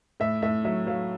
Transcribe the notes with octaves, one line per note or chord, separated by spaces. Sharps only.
A2 E5
A2 E5
F#3 E5
F#3 F5